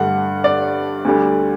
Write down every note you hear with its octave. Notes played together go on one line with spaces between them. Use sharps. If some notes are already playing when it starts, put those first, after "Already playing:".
Already playing: G2 D3 A3 F#5
D5
D2 D3 G3